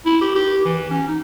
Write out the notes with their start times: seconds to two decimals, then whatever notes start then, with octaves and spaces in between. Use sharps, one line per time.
0.06 E4
0.21 G4
0.35 G4
0.65 E3
0.91 C#4
1.08 D#4